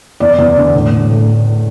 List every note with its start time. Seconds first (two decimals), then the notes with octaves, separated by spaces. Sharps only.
0.20 E2 D5
0.38 E2
0.57 D3
0.74 A2
0.92 A2
1.10 A2